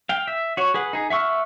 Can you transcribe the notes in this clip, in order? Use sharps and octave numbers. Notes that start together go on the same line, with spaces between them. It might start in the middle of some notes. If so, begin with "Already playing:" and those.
F5 G5
E5
F#4 C#5
G#4 B4 F#5
D#4 G#4
E5 F#5 C#6 E6 F6